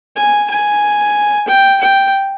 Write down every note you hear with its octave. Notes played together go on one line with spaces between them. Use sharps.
G#5
G#5
G5
G5